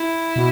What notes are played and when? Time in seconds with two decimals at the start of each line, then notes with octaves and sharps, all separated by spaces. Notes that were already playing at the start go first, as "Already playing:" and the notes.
Already playing: E4
0.36 B2